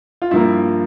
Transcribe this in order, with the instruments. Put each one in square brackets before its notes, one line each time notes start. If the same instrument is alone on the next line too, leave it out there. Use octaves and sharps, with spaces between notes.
[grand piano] F4
G2 F3 A#3 E4